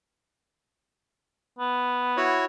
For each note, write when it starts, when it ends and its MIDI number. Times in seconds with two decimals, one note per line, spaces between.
1.59 2.35 59
2.17 2.45 64
2.17 2.45 66
2.17 2.45 73